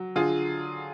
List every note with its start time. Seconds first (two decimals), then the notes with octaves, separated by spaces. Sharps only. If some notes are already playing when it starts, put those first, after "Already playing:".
Already playing: F#3
0.15 D3 F4 G#4